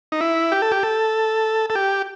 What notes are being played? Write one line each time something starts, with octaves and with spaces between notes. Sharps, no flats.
D#4
E4
G4
A4
G4
A4
A4
G4